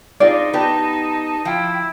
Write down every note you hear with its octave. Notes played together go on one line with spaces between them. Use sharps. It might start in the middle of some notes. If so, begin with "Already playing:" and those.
C4 D#4 F4 G#4 D5
B3 G4 B4 A5
F3 E4 G5